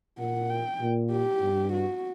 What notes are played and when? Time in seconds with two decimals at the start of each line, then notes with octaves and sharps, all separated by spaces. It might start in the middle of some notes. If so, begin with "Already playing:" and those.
0.19 A#2 F#5
0.50 G5
0.81 A#2
1.12 G4
1.42 G2
1.73 F#4